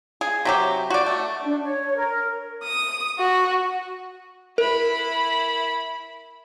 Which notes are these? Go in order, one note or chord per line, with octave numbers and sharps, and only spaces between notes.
G#4
C3 F#3 G4
F#4 D5
A3
D4
C#5
A#4
D#6
F#4
E4 A#4 B5